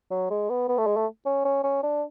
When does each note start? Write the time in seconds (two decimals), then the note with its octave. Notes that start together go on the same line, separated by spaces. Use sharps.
0.11 F#3
0.30 G#3
0.49 B3
0.68 B3
0.77 A3
0.87 G#3
0.96 A3
1.25 C#4
1.45 C#4
1.64 C#4
1.83 D4